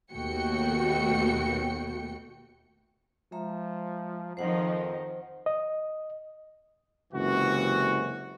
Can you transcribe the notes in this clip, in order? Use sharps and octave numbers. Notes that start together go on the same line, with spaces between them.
D#2 B2 A3 F#4 G5 C#7
F3 G#3 E5 A#5
F2 D#3 F3 D#4 C5 F#5
D#5
F#1 C#2 C3 E3 F#4